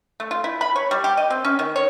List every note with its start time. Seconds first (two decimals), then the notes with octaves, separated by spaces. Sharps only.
0.20 A3
0.31 F4
0.44 E4
0.61 B5
0.76 C#5
0.91 G3
1.04 G4
1.17 D#5
1.30 C4
1.45 C#4
1.59 D#3
1.76 C#5